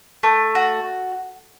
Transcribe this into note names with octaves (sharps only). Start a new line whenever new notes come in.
A3
F#4